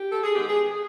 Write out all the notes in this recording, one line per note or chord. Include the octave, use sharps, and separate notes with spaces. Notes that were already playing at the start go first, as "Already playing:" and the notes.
Already playing: G4
A4
G#4
D#3 G#3 B3 G4
G#4
G#4